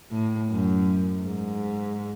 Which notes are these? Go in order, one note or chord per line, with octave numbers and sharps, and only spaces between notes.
A2
F#2
G#2